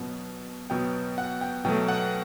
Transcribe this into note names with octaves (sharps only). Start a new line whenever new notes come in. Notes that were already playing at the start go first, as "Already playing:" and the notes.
Already playing: B2 F#3 B3
B2 F#3 B3 G5
F#5
G5
B2 F#3 A3 G5
F#5